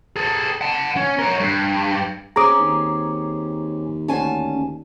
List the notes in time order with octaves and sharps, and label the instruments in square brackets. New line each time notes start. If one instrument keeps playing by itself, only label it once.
[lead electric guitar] G#4 A4
F#5 A5
C#4
A#4 C#5
G2
[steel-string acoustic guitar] C4 C#4 G#4 [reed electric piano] A#5 D6 D#6
[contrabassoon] D#2
[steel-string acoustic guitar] D2 G#5 A5 [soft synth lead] C#4